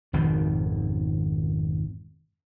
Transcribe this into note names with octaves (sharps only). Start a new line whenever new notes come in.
G#1 F2 B2 D#3